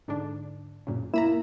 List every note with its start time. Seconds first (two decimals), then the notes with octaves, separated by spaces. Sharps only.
0.08 G#2 D3 D4
0.87 F#2 A#2 C#3
1.14 A#3 E4 A#5 B5 E7